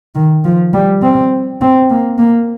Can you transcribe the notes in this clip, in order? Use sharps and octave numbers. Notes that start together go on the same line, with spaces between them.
D#3
F3
G3
C4
C4
A#3
A#3